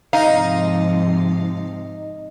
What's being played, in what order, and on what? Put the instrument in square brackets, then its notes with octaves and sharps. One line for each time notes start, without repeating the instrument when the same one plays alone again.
[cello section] G#2 C3 F3 [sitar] D#4 [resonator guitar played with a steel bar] F5